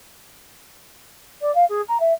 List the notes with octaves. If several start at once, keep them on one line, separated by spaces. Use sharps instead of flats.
D5
F5
G#4
A#5
E5